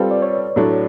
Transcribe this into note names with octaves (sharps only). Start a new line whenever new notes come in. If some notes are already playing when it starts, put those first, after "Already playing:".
Already playing: G3 C4 F4 A4 B4
D5
C#5
A2 F#3 A3 D4